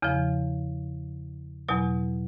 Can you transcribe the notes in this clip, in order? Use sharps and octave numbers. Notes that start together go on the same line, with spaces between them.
E2 C#3 F3
E2 B2 F#3